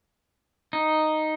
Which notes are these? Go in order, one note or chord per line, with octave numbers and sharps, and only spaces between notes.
D#4